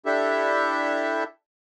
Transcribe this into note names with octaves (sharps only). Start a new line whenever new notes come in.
D4 E4 G4 A4 E5